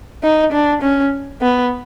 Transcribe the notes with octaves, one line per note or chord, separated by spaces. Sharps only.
D#4
D4
C#4
B3